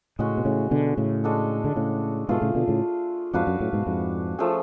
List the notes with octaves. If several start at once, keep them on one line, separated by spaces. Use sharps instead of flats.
A2 C#3 G#3 C#4 F#4
B2
A2 C#3
B2 D3
A2 C#3
G#3 D4 F#4 A4
D3
A2 C#3
G#2 B2 A3 F4 G#4
A2 C#3
B2 D3
A2 C#3
F2 G#2 D4 F#4 B4 F5
F#2
F#2 A2
G#2 B2
F2 G#2
F3 A3 C#4 G#4